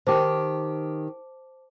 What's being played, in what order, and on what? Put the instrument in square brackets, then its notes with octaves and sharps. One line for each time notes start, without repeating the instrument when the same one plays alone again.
[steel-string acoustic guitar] D#3 G4 [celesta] C5 A5 D6